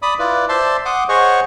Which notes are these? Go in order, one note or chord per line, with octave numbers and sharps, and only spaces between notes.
D5 B5 D#6
E4 F4 B4 D5
C5 D5 E5 A5 C6
F#5 C6 D6 D#6
G#4 C5 C#5 D#5 F#5 C#6